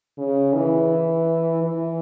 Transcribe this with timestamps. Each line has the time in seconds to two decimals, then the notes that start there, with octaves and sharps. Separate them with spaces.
0.18 C#3
0.55 E3
1.62 E3